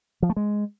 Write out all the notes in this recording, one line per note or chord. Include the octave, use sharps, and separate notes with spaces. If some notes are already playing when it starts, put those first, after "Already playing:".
F3
A3
G#3